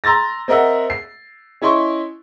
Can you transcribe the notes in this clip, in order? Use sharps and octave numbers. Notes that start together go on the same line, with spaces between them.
A#5 C6 E6 A6 A#6
C4 A#4 D#5 E5 F#5
C7
C#4 E4 D#5 C6 C#6